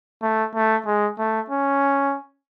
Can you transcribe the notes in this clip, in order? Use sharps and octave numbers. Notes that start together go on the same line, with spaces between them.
A3
A3
G#3
A3
C#4